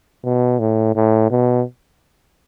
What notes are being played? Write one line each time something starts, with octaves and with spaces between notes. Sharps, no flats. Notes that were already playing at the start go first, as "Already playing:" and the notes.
B2
A2
A2
B2